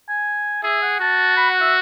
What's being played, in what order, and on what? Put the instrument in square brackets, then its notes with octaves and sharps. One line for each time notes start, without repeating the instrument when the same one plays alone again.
[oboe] G#5
[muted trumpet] G#4 [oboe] E5
[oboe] F#5
[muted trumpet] F#4 [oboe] A5
[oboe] B5
F#5
E5